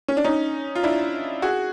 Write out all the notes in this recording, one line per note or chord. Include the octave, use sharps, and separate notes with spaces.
C#4
D4
C#4 D#4
F4
D4 E4
F#4 G#4